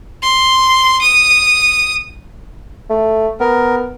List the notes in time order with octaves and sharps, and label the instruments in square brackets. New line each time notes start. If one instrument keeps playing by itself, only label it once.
[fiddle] C6
D#6
[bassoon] A3
[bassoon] B3 [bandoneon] A#4